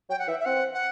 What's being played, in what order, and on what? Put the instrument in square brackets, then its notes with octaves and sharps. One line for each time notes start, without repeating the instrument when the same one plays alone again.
[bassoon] F#3 [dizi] G5
[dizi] F#5
[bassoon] E3 [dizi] E5
[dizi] E5
[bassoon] C4 [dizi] F#5
[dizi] F#5